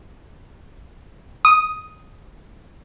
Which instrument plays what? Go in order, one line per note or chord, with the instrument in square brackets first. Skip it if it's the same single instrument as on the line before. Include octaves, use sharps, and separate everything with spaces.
[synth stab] D#6